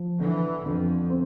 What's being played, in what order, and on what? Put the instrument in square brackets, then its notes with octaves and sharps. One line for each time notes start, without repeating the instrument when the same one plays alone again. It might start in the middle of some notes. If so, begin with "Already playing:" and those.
Already playing: [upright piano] F3
[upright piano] D3 [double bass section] E3
[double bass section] F2 [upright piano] D3
[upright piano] C4